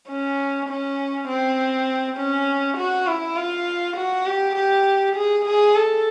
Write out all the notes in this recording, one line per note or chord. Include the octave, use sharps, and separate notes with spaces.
C#4
C#4
C4
C#4
F#4
E4
F4
F#4
G4
G4
G#4
G#4
A4